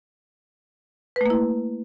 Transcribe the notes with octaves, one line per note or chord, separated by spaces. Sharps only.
A3 A#3 E4 B4